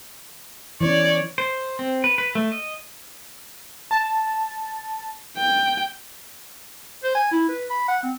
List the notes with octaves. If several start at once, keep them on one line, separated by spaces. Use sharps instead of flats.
E3 C#4 C#5 D5
C5
C4
B4
B4
A3
D#5
A5
G5
C5
G#5
E4
B4
B5
F#5
C4